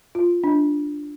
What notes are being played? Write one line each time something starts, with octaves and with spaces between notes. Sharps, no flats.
F4
D4